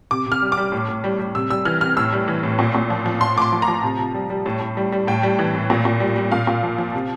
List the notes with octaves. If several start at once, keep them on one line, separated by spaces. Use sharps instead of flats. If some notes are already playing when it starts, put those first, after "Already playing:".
C3 D6
C3
F6
G3
D6
G3
A2
A2
G3
G3
C3 E6
G3 E6
E3 F6
C3 F6
A2 E6
G3
E3
A2
A#2
A#2
F3
F3
A2 C6
A2 D6
C6
F3
A#5
F3
C3
C3
G3
G3
A2
A2
G3
G3
A2 G5
G3
E3
A2
A#2
A#2
G3
G3
A#2 F5
A#2
F3
F3
C3